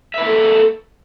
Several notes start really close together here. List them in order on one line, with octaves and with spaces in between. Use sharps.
E5 B4 A#3 A4